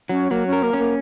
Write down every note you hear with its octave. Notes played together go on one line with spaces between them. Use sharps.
F#3 C#4
F#3 A#3
C#4
A#4
A#3
A#3 C#4